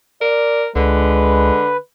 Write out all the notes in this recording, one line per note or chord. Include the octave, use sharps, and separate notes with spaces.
A#4 D5
C#2 D3 G#3 B4